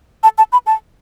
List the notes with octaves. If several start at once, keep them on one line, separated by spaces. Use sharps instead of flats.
A5
A5
B5
A5